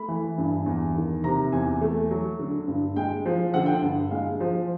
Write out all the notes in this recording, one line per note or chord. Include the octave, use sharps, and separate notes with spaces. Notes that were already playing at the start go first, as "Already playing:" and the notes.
Already playing: A3 B5
E3
G2
E2
D#3
C3 A#5
E2 G#5
A3
F#3
D3
G2
G#3 G5
F3
D3 F#5
G5
F#5
G2
G#3 F5
F3